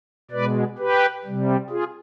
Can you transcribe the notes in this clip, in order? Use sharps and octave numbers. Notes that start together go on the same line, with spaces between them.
B2 G#3 B4 D5
G4 B4
C3 G3
F4 G#4